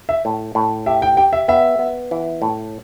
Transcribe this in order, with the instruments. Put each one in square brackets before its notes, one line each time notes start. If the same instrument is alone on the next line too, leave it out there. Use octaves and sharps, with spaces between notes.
[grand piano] E5
[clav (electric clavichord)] A2
A2
[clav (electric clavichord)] G4 [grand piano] E5
[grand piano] G5
[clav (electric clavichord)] G4 [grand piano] G5
[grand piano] E5
[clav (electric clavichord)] B3 [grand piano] E5
[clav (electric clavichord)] B3
E3
A2